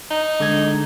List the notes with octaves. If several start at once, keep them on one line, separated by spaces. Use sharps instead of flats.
D#4
D3 G#3 G#6